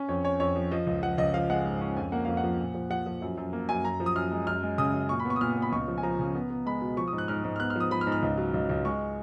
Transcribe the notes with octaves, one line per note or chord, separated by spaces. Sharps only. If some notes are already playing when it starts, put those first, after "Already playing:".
Already playing: C#4
F2 C#5
C#4 C#5
F2 C#5
F3
F3 D#5
C#2
F3 F#5
C#2 D#5
F3 F5
G#3 F#5
G#2
C#4
F2 G#5
A#3 F#5
F2 F5
F#5
F3
A#2
F3
F3 F#5
F3
F#2
F#2
A#3
F#2 G#5
F#2 A#5
F3
D#6
F#2 F6
G#3
F#2 F6
G#3
C#3 D#6
F#2
A#2 C#6
B5
B3
C#6
D#6
A#2 F6
B3
B5
C#2 C#6
F3
G#5
F3 A#5
C#3
B3
B3
G#3 B5
B2
F3 C#6
D#6
G#2
F#6
G#2 F6
G#2
F6
B3 F#6
F6
F3 D#6
F3 B5
F6
G#2
F6
C#2
F#3
C#2
C#2
G#3 C#6